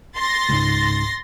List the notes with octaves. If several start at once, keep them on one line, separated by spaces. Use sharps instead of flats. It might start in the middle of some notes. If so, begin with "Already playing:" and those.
C6 A6 A#6
C#2 G#2